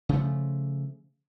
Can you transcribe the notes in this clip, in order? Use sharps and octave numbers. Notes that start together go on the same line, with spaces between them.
C#3 F3 A3